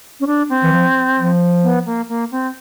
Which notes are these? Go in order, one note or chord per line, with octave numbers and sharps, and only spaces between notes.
C#4
D4
C4
E3
F3
F3
B3
A#3
A#3
C4